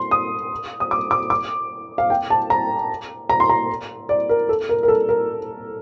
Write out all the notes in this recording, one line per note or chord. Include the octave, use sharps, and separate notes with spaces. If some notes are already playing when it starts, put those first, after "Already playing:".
Already playing: C6
D#6
D#6
D6
D6
D6
F5
G5
A5
A#5
A#5
C6
A#5
D5
A#4
A4
A#4
A#4
A4
A#4